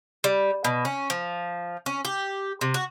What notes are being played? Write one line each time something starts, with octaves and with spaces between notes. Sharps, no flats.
G3
B2
C#4
F3
C#4
G4
C3
F#4